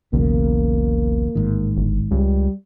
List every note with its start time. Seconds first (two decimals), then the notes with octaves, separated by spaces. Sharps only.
0.13 E1 B1 E2 C#3 A#3
1.35 A1 G#2 D#3
1.77 G1
2.11 C#2 G3